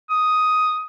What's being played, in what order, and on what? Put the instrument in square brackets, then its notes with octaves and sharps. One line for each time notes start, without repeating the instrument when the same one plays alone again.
[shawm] D#6